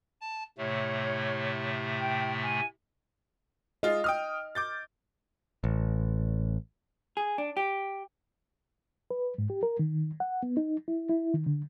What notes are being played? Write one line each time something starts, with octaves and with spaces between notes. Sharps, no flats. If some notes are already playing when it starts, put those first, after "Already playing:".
A5
A2 C3 A3 C#5
G5
G#5
G#3 F4 D#5
G5 D#6 F6
D6 G6 A6
A1
G#4
D4
G4
B4
G#2
G4
A#4
D#3
F#5
B3
D#4
E4
E4
D#3
D3